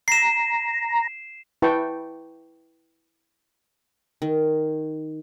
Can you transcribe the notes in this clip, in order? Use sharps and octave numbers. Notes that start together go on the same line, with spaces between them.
A#5 C7 E7
E4 B4 G5 A5 C#6
D#3